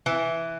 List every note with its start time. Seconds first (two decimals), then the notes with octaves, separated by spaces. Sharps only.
0.06 E3